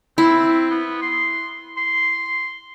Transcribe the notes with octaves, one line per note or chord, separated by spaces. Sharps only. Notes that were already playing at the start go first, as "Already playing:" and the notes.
C4 E4
B3
C6
C6